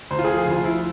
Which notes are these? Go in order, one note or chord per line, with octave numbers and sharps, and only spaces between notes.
D2 C5
F4
G#4
F3
G#4
D2 F4
F3 E4